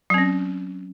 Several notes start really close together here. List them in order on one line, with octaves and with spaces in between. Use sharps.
F#3 C4 C#4